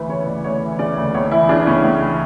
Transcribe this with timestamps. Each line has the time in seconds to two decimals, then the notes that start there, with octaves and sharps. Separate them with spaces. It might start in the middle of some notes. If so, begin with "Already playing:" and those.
Already playing: D2 E3 B4
0.09 C#3 C#5
0.26 D2 D5
0.44 D2 C#5
0.62 E3
0.79 C#3 D5
0.98 D2
1.14 C#2 C#5
1.31 E3 E4
1.49 C#3 D4
1.60 D4
1.67 C#2 C#4
1.84 C#2
2.02 E3